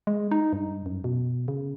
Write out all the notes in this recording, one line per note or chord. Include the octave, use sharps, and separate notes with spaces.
G#3
D#4
G2
F#2
B2
C#3